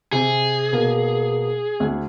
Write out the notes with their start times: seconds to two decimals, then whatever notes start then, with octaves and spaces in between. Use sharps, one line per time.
0.13 C3 G#4
0.72 B2 A#3
1.80 D2